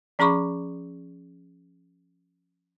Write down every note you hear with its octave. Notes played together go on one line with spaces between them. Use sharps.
F3 C#4 G#4 B5 C#6 D6